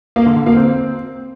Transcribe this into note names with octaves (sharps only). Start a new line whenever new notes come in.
A#3
D3
D3
A#3
C4